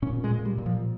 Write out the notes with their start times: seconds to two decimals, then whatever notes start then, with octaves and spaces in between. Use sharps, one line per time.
0.02 A#2 C#4
0.24 G#3
0.31 A#2
0.45 G3
0.58 A#2
0.66 F3